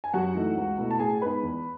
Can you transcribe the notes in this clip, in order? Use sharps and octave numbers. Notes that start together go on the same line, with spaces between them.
G#5
F#2 F#4 F#5
E3 A3 D#4
C#2
B2 A3 E4
A5
A2 G#4 G#5
G#3 B3 D#4 B4 B5
E2